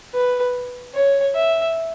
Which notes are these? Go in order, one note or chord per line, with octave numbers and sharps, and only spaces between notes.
B4
C#5
E5